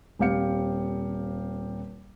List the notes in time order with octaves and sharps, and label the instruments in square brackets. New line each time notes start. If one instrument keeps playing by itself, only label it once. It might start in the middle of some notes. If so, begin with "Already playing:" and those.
[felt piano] D#1 C4 G4 F5 C#7